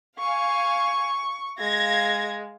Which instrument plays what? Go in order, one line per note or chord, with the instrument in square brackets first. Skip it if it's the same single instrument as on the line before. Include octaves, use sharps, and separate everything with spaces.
[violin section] F5 G#5 [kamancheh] C#6
[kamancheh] G#3 [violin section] F5 G#6 A#6